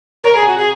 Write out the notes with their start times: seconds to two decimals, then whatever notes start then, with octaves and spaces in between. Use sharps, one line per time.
0.24 A#4 C#5
0.34 G#4 A#5
0.42 G#5
0.48 F#4
0.58 G#4